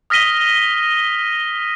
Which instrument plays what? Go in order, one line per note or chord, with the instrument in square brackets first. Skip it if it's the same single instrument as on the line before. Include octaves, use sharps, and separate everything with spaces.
[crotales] D#6 F6 A#6 B6 D#7 G7